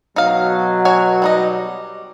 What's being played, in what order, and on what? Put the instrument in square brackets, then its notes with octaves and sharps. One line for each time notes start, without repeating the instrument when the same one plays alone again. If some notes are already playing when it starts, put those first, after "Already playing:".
[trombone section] B2 F#3 [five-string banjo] D#4 F5
[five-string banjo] F#4 C#5 G#5
G3 D#4 D#5